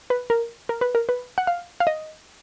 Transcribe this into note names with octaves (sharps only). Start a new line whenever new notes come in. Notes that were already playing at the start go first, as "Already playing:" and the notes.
B4
A#4
A#4
B4
A#4
B4
F#5
F5
F5
D#5